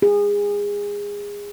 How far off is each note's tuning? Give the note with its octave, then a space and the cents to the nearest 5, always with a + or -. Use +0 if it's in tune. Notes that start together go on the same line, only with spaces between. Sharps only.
G#4 -25